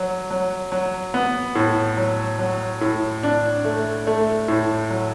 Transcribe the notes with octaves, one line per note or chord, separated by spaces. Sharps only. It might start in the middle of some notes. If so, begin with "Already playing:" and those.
Already playing: F#3
F#3
F#3
B3
A2
F#3
F#3
A2
D4
A3
A3
A2
F#3